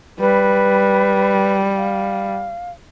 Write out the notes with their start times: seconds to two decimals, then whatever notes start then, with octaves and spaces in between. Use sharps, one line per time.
0.20 G3 B4
1.76 F5